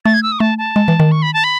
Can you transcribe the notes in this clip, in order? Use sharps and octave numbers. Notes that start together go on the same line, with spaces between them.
A3 A6
G#6
E6
D#6
A3 A5
A5
G#3
E3
D#3
C#6
B5
A5
B5